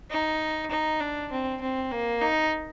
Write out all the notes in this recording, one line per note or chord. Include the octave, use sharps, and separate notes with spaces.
D#4
D#4
D4
C4
C4
A#3
D#4